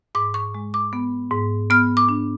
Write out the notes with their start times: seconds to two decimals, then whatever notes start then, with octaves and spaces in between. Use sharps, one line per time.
0.15 G#2 D6
0.34 C#6
0.54 G#3
0.74 D6
0.93 B3
1.31 G#2
1.70 B3 F6
1.97 D6
2.09 D4